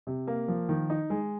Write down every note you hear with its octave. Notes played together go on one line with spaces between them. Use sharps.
C3
A#3
F3
D#3
D#4
G#3